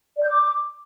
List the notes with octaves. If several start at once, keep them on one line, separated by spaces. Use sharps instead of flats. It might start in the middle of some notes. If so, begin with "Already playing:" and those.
D5
G6
D6